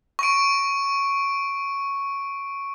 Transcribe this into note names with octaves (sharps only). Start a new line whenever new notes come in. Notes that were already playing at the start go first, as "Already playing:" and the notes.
C#6 D7